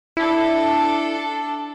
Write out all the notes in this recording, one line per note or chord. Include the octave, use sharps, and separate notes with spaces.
D4 E4 A4